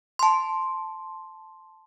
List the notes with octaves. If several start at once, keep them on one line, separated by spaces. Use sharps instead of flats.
A5 C6